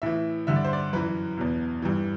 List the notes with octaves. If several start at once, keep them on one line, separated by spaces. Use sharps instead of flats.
A2 E3 E5
G2 D3 E5
D5
C5
D5
F#2 E3 B4
E2 B2
G2 E3